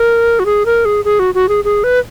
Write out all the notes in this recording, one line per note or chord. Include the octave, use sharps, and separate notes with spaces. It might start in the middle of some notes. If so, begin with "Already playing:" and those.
Already playing: A#4
F#4
G#4
A#4
G#4
G#4
F#4
F#4
G#4
G#4
B4